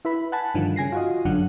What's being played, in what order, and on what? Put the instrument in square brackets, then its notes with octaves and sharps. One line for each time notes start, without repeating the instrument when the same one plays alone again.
[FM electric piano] E4 B4 B5
F#5 G#5 A5 B5
G2 D3 D#3 F3
C#3 G#5 A#6 C7
F4 F#4 D#5
G1 F#2 D3 F#3 D4 F#5